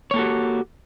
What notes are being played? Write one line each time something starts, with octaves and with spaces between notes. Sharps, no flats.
A#3 F#4 G4 A4 C#5